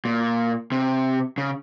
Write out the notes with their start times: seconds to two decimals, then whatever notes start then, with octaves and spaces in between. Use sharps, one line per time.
0.05 A#2
0.72 C3
1.38 C#3